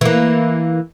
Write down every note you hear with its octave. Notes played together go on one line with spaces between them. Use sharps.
E3 A#3